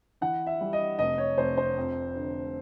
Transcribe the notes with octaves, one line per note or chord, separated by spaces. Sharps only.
E3 F#5
E5
G3
D#5
F1 D#5
C#5
F1 C5
C5
F2
D3